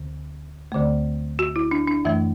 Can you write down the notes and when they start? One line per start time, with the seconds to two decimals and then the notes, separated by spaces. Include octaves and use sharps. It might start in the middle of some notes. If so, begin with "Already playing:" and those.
Already playing: D2 D3
0.72 D2 D3 A3
1.39 F#4
1.56 E4
1.71 D4
1.88 D4
2.05 F#2 E3 A3 E5